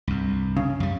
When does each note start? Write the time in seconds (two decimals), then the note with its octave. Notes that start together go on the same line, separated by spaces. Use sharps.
0.07 C2 G2
0.57 C#3
0.80 F#2 G3